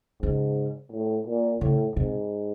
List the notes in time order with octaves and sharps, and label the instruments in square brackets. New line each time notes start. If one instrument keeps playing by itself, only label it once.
[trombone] G#2 [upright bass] C#3
[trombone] A2
A#2
[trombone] A2 [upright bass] C#3
[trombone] G#2 [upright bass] C3